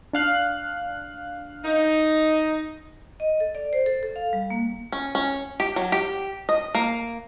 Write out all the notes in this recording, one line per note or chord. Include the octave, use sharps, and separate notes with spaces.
D4 F5 F#6
D#4
D#5
A4
D5
C5
A4
A4
F5
G3
A#3
C#4
C#4
G4
F#3
G4
D#5
A#3